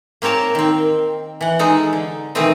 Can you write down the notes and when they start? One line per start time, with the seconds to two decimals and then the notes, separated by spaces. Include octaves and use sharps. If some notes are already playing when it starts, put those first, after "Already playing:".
0.22 A#3 C4 A#4 C#5 A5
0.55 D#3 C4
1.41 E3 F#5
1.59 G#3 D#4 A4
1.93 D3
2.35 B2 D#3 E3 A3 C4 D#5